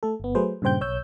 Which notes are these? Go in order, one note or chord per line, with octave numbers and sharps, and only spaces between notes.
A3 A4
G1 B3
F#3 A3 G#4 B4 C5
G2 A#2 C#3 C5 G5 G6
B1 C#5 E6 G6